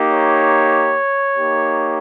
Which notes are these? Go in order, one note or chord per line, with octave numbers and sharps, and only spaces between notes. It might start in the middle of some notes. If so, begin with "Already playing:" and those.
Already playing: A#3 D#4 G4
C#5
A#3 D#4 G4